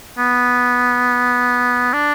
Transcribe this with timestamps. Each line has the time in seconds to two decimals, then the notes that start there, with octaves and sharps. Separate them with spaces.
0.18 B3
1.93 D4